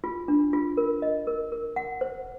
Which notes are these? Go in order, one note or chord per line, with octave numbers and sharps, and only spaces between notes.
F4
D4
F4
A#4
D#5
A#4
A#4
F#5
C5